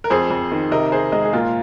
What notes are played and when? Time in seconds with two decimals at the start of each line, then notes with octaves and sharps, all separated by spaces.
0.04 A#4
0.10 F2 G#4 C5
0.30 F2
0.51 D#3
0.71 C3 A#4 D#5
0.92 C3 G#4 C5
1.12 G#3 A#4 D#5
1.25 G#4
1.33 A#2 F4 A#4